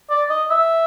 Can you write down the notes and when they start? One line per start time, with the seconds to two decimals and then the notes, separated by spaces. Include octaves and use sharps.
0.10 D5
0.30 D#5
0.51 E5